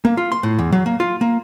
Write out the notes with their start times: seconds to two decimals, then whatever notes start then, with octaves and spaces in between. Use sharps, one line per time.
0.05 A#3
0.17 F4
0.32 C6
0.43 A2
0.59 E2
0.72 F#3
0.86 A#3
1.00 F4
1.21 A#3